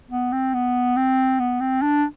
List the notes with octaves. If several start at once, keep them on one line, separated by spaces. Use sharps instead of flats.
B3
C4
B3
C4
B3
C4
D4